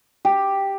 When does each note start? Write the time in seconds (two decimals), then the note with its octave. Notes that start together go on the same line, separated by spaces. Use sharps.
0.25 G4